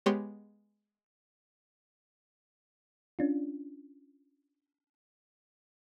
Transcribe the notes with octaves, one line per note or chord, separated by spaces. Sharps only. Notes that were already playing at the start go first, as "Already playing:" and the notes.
G#3 B3 G4 C#5 C6 D#7
C#4 D4 F4